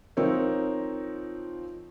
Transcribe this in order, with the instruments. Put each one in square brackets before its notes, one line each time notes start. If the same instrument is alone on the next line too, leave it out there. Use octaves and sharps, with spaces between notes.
[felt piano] F3 C4 D#4 A#4 C#5